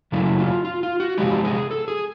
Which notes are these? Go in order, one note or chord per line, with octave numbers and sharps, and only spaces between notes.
F#2 C#3 F#3 A3 E4
F4
F4
F4
F#4
C3 F3 G#3 G4
G#4
A4
G#4